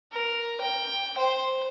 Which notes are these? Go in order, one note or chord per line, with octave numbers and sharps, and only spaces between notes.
A#4
G5
C5